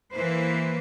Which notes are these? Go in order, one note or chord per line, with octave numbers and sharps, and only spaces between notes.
E3 A#3 B4 C5